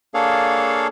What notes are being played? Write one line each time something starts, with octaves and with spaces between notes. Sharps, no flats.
A#3 D4 G#4 A4 C#5 F5